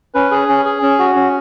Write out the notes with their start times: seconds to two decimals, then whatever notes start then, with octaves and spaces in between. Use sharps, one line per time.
0.14 C#4 B4
0.31 G#4
0.49 C#4
0.65 G#4
0.83 C#4
0.99 F#4
1.16 C#4